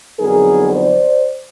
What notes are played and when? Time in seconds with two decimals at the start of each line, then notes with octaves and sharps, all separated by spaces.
0.19 F2 D3 F#3 B3 D#4 G#4 A#4
0.70 C5 D5